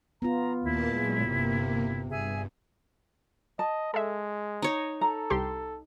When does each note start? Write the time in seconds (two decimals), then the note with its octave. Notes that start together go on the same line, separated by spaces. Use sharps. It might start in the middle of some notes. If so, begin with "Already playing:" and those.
0.22 B3 F4 A#5
0.63 D#2 A#2 A#3 E4 A5
0.95 A#2 F#3 G#3
1.24 G1 C3 A#3
2.10 G2 G#4 E5 G#5
3.59 D#5 A5
3.94 G#3 A4 E5
4.62 D#4 C#5
5.01 A4 A#5
5.30 C2 G4 C6